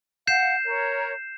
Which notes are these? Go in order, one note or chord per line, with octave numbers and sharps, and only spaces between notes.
F5 F#5 G6 C7 E7
A#4 C#5